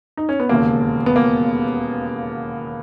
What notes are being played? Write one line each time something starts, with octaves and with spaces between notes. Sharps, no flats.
D#4
C#4
B3
E1 D#2 C#3 A#3
B3
A#3